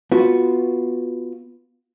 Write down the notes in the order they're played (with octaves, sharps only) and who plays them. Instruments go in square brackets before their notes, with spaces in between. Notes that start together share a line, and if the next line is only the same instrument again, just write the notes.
[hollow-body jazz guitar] B3 F4 F#4